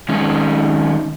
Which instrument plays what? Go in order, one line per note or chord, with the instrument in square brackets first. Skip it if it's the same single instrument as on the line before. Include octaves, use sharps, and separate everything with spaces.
[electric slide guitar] D#3 G#3 C#4